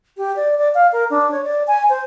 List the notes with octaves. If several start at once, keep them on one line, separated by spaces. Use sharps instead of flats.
G4
D5
D5
F5
A#4
D4
C#5
D5
G#5
C5